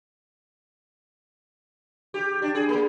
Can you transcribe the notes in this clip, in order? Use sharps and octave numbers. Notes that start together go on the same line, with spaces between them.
G4
D4
G#4
A#3